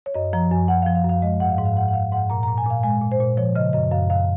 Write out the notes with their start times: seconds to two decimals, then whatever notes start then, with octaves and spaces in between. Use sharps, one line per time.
0.06 C#5
0.15 F#2 D#5
0.33 F3 A#5
0.51 F#2 G#5
0.68 F#2 F#5
0.82 F5
0.87 F3
0.95 F5
1.04 F#2
1.09 F5
1.22 G#3 D#5
1.40 G#2 F#5
1.50 F5
1.58 G#2
1.65 F5
1.77 G#2 F#5
1.88 F#5
1.94 G#2 F5
2.12 G#2 F#5
2.30 A#2 A#5
2.43 A#2 A#5
2.58 G#5
2.66 A#2 F5
2.83 G#3 G#5
3.01 A#2
3.12 C5
3.20 A#2
3.37 F3 C#5
3.56 C#3 D#5
3.73 F#2 D#5
3.92 F#2 F5
4.10 F#2 F5